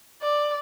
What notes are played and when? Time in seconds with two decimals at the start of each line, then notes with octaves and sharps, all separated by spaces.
0.22 D5